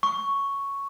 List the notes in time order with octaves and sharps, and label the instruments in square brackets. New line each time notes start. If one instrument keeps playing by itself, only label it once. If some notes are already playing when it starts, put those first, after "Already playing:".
[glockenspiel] C#6